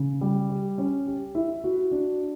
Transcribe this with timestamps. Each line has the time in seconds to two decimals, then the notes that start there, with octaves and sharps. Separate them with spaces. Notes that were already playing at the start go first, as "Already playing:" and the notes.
Already playing: C#3
0.21 G3
0.49 G4
0.78 C#4
1.07 G4
1.35 E4
1.64 F#4
1.91 D4